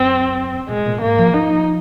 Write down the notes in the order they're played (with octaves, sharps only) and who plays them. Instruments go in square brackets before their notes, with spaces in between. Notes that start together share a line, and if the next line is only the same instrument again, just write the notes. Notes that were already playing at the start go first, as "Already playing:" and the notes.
Already playing: [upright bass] F#2 [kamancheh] C4
[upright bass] A#2 [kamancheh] G#3
[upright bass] A#2
[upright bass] G#2 [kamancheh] A#3
[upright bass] F3
[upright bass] F3 [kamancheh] D#4